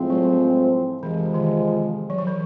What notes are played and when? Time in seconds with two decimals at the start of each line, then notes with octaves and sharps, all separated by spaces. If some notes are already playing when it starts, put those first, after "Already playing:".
Already playing: A2 F3 G#3 C4
0.10 F#3
1.02 F2 C3 E3 F3 G#3
1.34 D#3
2.10 F#3
2.18 F3
2.27 E3